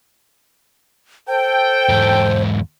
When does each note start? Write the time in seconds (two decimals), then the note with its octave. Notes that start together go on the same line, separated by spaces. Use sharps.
1.28 A4 C5 G5
1.89 E2 G#2